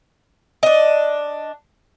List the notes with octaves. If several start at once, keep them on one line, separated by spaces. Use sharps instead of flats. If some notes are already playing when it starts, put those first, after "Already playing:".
D4 D#5